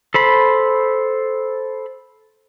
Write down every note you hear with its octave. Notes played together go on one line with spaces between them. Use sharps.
A4 C5 B5